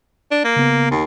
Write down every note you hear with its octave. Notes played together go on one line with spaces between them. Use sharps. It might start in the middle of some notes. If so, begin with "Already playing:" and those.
D4
A#3
C#3 B3
D#2